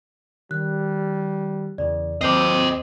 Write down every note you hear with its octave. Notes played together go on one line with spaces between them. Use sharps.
D#3 G3 F#6
E2 C#3 E3 D5
D#2 C4 A4 D#5 D6 G6 C7